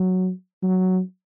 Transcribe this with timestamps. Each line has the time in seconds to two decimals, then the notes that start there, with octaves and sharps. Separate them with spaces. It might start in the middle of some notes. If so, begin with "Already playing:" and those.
Already playing: F#3
0.63 F#3